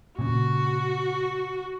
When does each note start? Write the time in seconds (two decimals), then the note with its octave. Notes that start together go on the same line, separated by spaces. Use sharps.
0.19 A#2 C#3 F#4